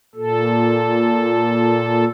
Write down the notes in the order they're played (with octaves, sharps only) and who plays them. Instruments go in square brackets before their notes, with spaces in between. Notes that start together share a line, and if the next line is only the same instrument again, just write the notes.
[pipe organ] A#2 A4